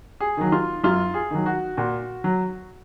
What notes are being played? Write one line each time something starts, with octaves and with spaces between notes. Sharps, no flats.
G#4
D#3 F#3
F4
F#2 F4
G#4
D#3 F#3
F#4
A#2 F#4
F#3